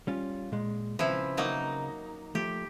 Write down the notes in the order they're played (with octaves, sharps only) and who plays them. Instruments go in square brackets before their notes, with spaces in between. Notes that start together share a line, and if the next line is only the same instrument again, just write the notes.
[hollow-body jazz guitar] G3 C#4 F4
A#2 G#3
[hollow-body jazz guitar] C#3 C4 B4 [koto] F3 E4
[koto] F#3 A#3 D#4
[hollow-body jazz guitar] F3 A3 [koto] G4